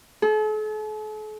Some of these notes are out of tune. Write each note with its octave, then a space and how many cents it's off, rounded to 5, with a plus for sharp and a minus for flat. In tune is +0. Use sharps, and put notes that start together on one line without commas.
A4 -45